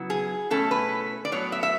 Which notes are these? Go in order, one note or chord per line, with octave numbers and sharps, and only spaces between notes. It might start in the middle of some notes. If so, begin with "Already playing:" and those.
Already playing: C#3 F#3 B3 E4
G#4
B2 A3 C#4 E4 A4
B4
D5
A2 F#3 B3 C#5
E5
E5